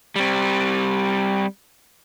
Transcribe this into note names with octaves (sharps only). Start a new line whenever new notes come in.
G3 C4